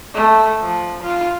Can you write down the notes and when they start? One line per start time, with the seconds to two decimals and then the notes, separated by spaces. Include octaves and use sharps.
0.14 A3
0.62 F3
1.03 F4